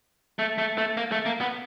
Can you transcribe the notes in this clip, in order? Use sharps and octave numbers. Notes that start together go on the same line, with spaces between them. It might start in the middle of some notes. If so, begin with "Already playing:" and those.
A3
A3
A3
A#3
A3
A#3
B3